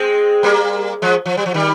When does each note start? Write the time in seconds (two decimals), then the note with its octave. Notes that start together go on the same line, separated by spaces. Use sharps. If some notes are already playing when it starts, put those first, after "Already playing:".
Already playing: G#3 C4
0.43 G3 A#3
1.02 F3 G#3
1.26 F3
1.37 G3
1.46 F3
1.54 D#3 G3